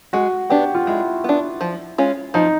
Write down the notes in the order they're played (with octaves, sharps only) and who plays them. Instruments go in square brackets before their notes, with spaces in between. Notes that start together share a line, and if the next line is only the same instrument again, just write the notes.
[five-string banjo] G#3 [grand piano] F#4
[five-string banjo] B3 D4 [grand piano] G4
[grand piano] F4
[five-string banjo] G#3 [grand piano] E4
[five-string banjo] B3 D4
F3
G#3 C#4 F4
[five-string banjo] F3 [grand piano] D#4